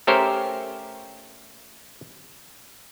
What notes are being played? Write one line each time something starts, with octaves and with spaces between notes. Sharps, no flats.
A3 C#4 G4 A#4 C5 C#5